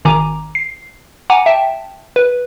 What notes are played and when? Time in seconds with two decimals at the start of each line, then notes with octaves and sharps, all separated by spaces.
0.05 G#1 D#3 G#5 A#5 D6
0.55 C7
1.30 F#5 G#5 A#5 D6
1.46 E5 G5 A5
2.16 B4